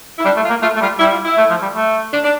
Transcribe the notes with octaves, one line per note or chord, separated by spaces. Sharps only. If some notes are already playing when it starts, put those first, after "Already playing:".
E4
G3 D4
A3
F4
A#3
A3 F4
A3
G3 F4
G3 E4
F4
E4
A3
F3
G3
A3
D4
D4